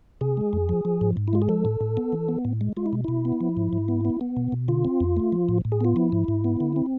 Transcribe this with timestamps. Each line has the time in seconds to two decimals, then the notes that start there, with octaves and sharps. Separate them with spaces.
0.21 C3 G#4
0.37 G#3
0.53 F2
0.69 F3
0.85 F3
1.01 G#2
1.17 G#2
1.28 E4
1.33 G#3 F4
1.42 G#4
1.49 F3 A4
1.65 A2
1.81 A2
1.97 B3
2.13 E3
2.29 B3
2.45 A2
2.61 G#3
2.77 G#3 F4
2.86 E4
2.93 B2
3.04 B2 E4
3.25 B3
3.41 F3
3.57 G#2
3.73 G#2
3.88 B3
4.05 B3
4.21 B3
4.37 B2
4.52 B2
4.68 D3 F4
4.85 C4
5.00 F2
5.17 A3
5.32 F3
5.49 A2
5.65 A2
5.72 G#4
5.81 B3 F4
5.96 F3 E4
6.12 G#2
6.28 G#2
6.44 B3
6.60 D3
6.76 C4